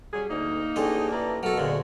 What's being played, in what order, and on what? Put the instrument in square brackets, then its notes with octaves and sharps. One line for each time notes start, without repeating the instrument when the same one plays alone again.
[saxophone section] F#3 C#4 G#4 [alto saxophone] G3
[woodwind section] D2 [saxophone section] A#3 [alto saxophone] D#4
[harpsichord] A1 A2 D#5 [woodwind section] D4 G#4
[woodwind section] E3 A4 A#5 [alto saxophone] D5
[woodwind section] B2 A3 [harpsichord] F#3 A4 [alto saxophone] A#4
[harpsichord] D2 A#2 [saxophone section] F#4 G#4